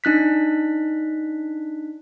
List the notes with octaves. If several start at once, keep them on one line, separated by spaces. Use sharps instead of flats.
D4 D#4 F#6 B6